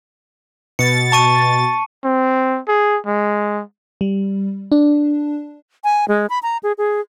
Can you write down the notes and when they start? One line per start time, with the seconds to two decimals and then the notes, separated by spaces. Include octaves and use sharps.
0.79 B2 A6 C#7
1.12 A5 C#6 D#7
2.04 C4
2.68 G#4
3.07 G#3
4.01 G3
4.72 D4
5.84 G#5
6.08 G#3
6.30 B5
6.43 A#5
6.63 G#4
6.78 G#4